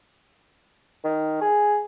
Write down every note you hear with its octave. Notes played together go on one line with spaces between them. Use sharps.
D#3
G#4